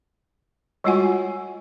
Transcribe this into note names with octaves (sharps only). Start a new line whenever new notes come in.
G3 G#3 F4 F#4 F#5 G#5